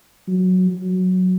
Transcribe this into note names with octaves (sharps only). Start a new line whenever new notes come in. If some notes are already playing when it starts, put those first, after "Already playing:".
F#3
F#3